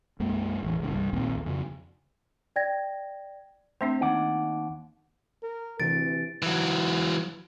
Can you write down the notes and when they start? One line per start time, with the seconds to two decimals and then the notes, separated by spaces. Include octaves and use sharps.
0.20 B1 F#2 G#3 A#3
0.63 A1 E2
0.80 F#1 C2 G#2 C#3
0.91 C2 G2
1.13 A#1 D#2 A#2 C4
1.46 F2 C#3
2.56 D5 G5 G#6 A#6
3.81 A3 C4 D4 C5 E5 C6
4.01 D#2 D#4 F#5 D6
5.42 A#4
5.80 D2 C3 E3 A6 D7
6.42 E3 F#3